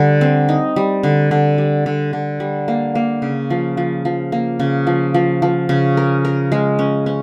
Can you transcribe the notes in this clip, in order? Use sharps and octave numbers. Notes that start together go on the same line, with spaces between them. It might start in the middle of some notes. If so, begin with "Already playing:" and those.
Already playing: D3 G3
C4
D#4
G3
D3
D3
G3
D3
D3
G3
A#3
A#3
C#3
F3
F3
F3
A#3
C#3
F3
F3
F3
C#3
A#4
A#4
G#3
C#4
C#4